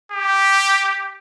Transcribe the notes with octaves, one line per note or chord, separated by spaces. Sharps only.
G4